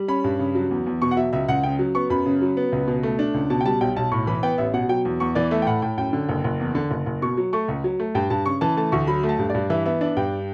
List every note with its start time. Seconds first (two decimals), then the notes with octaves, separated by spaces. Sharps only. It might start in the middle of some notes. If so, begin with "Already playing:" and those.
Already playing: G3
0.08 C#4 B5
0.24 G2
0.39 C#3
0.55 F#3
0.71 E2
0.86 E2
1.02 B2 C#6
1.11 F#5
1.17 F#3 E5
1.33 C#2 E5
1.48 C#2 F#5
1.64 C#3 G5
1.79 F#3
1.95 B3 C#6
2.10 F#2 B5
2.26 C#3
2.41 F#3
2.57 B3
2.72 C#2
2.88 B2
3.03 A3
3.19 D4
3.34 C#2
3.50 B2 A5
3.61 G5
3.65 G3 A5
3.81 B1 G5
3.96 B1 A5
4.11 A2 C#6
4.27 E3 B5
4.43 B3 G5
4.58 A1 E5
4.74 B2 F#5
4.89 F#3 G5
5.05 E2
5.20 E2 C#6
5.35 E3 D5
5.51 A3 E5
5.62 G5
5.66 A2 F#5
5.82 A2 G5
5.98 F#2 G5
6.13 D3
6.29 F#1
6.44 F#1
6.60 E2
6.75 D3
6.91 F#1
7.06 F#1
7.22 B2 C#6
7.37 F#3
7.53 A3 C#6
7.68 C#2
7.84 F#3
8.00 A3
8.15 G2 G5
8.30 G2 A5
8.46 C#3 C#6
8.61 E3 A5
8.77 A3 A5
8.92 D2 C#6
9.07 F#3 B5
9.23 A3
9.29 A5
9.39 G2
9.50 G2 D5
9.70 E3 E5
9.86 B3 E5
10.01 D4 E5
10.17 G2 G5